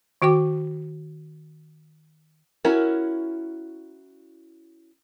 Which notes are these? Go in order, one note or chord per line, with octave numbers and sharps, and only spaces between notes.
D#3 F#4 G5 D6
C#4 E4 F#4 A#4